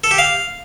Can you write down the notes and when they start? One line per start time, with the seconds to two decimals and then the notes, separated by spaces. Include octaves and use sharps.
0.04 A4
0.11 G4
0.18 F5